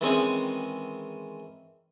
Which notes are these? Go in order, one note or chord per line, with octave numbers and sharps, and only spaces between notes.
D#3 E3 G#3 C4 C#4 D#4